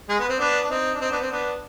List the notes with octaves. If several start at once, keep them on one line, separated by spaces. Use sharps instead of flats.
G#3
B3
C4
B3 D4
D4
C4 D#4
D4
C4 D#4
B3 D4
C4
B3 D4